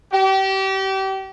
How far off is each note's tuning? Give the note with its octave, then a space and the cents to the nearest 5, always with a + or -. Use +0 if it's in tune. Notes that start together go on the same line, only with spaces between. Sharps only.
G4 -30